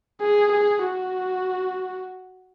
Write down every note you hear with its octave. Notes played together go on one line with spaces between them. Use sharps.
G#4
G#4
F#4